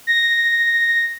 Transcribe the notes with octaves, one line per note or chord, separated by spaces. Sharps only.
A#6